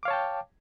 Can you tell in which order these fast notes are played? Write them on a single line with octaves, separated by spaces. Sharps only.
D6 F5 C#5 A5 G5